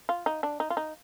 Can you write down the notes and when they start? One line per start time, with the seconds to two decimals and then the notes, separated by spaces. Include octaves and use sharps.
0.09 F4
0.26 D#4
0.43 D4
0.60 D#4
0.70 F4
0.77 D#4